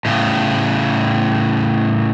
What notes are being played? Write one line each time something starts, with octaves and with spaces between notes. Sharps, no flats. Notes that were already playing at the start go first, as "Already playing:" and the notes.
A2 C#3